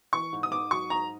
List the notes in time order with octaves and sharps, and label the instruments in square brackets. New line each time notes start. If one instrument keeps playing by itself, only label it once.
[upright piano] E3 C#6
G#2
D#6
G#2 D6
F#3 C#6
G#2 A#5